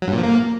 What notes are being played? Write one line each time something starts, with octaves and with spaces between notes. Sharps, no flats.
F#3
G2
A#2
F3
A#3